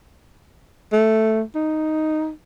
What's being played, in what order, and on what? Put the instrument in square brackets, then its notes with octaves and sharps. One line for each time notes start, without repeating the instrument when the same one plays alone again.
[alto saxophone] A3
D#4